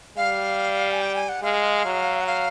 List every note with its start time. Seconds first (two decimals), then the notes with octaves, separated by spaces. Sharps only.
0.17 G3 F5
0.91 G#5
1.01 G5
1.15 G#5
1.29 F#5
1.43 G#3 F5
1.85 F#3
2.21 F#5
2.27 F5